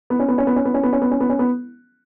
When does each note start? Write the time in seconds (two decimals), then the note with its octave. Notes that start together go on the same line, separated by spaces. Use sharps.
0.10 B3
0.19 C#4
0.28 B3
0.38 C#4
0.47 B3
0.56 C#4
0.65 B3
0.74 C#4
0.83 B3
0.93 C#4
1.02 B3
1.11 C#4
1.20 B3
1.29 C#4
1.39 B3